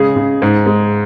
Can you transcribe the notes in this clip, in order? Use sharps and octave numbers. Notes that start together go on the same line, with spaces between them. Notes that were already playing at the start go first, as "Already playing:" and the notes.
Already playing: C#3 G#3 G#4
C#3
G#2
G#3